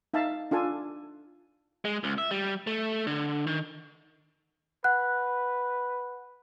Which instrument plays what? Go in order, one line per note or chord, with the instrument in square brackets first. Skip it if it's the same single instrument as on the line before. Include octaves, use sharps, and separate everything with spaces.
[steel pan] D#4 E5 F5 A5
D4 F4 A4 G#5
[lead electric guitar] G#3
C#2
E5
G3
A3
D3
D#3
[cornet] B4 [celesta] F#5 F#6